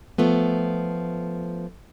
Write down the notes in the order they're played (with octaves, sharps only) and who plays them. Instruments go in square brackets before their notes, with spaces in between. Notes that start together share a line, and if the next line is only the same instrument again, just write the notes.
[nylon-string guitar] F3 A3 B3